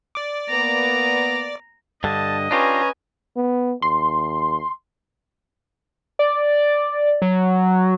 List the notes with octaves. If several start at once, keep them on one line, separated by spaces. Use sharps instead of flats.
D5 D6
A#3 B3 A#5
G2 D3 D#5 A5
C#4 D4 F4 G4 B4 G#5 A#5
B3
D#2 C6
D5
F#3